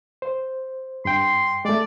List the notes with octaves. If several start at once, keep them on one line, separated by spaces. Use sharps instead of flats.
C5
G2 G5 C6
G#3 A3 D5